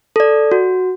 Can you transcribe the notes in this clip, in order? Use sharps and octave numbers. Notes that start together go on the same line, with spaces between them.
A4 D5
F#4